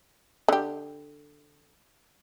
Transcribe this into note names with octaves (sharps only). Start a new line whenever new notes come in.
D3 G4